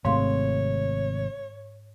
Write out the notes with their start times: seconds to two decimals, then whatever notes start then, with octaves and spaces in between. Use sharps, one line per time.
0.05 G#1 G#2 C3 A3 C#5 F5 C6